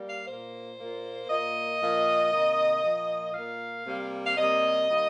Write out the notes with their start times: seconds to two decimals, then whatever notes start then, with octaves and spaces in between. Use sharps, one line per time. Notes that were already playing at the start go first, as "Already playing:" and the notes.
Already playing: G3 A#3
0.09 F5
0.27 A#2 A#3 C5
0.78 A#2 A#3
1.29 A#2 A#3 D#5
1.80 A#2 F3 A#3
2.32 C3 D#3 A#3
2.83 A#2 F3 A#3
3.34 A#2 A#3 F5
3.86 C3 G3 A#3
4.26 F5
4.37 C3 G3 A#3 D#5
4.89 D#3 G3 A#3